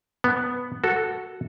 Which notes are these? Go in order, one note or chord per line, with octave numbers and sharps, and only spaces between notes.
B3
F#4 A4